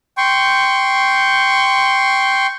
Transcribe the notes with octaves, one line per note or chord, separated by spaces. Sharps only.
G5 C6 C#6